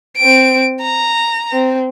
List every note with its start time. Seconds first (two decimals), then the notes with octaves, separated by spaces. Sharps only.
0.17 C4 D7
0.82 A#5
1.52 C4